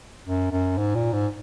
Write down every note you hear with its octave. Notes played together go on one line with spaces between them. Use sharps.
F#2
F#2
G#2
A#2
G#2